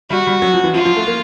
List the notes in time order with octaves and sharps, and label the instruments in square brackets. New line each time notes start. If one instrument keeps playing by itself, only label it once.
[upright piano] G3 [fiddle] F#4
[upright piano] G3
F#3
F3
E3
[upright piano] F3 [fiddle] F4
[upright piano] F3
A3
A#3